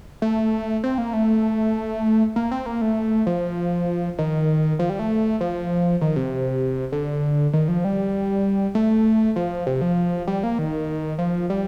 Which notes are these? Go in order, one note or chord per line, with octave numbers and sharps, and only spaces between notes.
A3
C4
A#3
A3
A#3
C4
A#3
A3
F3
D#3
F3
G3
A3
F3
D#3
C3
D3
D#3
F3
G3
A3
F3
C3
F3
G3
A#3
D#3
F3
G3